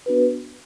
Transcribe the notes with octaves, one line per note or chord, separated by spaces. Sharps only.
B3 D4 F#4 B4